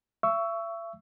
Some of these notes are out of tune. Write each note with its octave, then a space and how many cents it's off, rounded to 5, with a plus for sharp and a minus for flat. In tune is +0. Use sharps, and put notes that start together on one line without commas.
E5 +40 C#6 +15 E6 +5